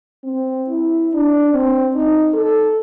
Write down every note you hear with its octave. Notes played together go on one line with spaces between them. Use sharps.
C4
E4
D4
C4
D#4
A4